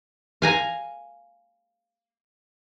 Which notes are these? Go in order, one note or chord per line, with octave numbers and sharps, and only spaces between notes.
F5 G#5 A#5